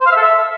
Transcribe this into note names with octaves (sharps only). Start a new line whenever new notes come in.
C5
F5
E5
A4
E5